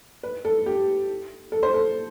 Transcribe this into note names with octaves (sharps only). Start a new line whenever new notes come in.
B4
A4
G4
A4
C5
A4